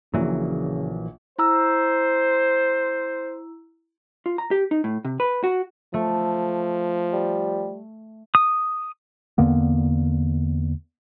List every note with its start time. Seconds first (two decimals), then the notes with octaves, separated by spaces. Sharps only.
0.14 A#1 A#2 C#3 E3 F#3
1.39 E4 C5 A#5 E6
4.26 F4
4.38 A#5
4.51 G4
4.71 D#4
4.84 A2
5.05 C3
5.20 B4
5.44 F#4
5.94 F3 A3
7.13 G3
8.35 D#6
9.38 E2 D3 A#3 B3